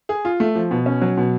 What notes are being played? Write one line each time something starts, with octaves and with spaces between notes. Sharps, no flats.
G#4
F4
A3
F3
B2
C#4
F#3
B2